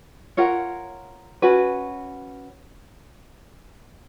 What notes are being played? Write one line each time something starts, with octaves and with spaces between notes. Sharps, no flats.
F4 A#4 C#5 F#5
C#4 F#4 B4